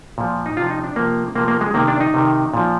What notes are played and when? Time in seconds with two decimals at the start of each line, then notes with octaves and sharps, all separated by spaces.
0.18 A#2 F3
0.46 D#4
0.57 C3 F3 F4
0.70 D#4
0.84 D4
0.96 C3 F3 A#3
1.35 C3 F3 A#3
1.48 A#3
1.61 G#3
1.74 C3 D#3 A#3
1.88 D4
2.00 D#4
2.14 C3 D#3
2.54 A#2 F3